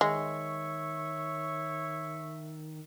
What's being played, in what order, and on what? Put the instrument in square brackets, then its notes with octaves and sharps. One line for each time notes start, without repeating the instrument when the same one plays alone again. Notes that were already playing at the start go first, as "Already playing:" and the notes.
[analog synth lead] D#3 [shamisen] G#3 [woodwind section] C#5 C#6 [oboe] E5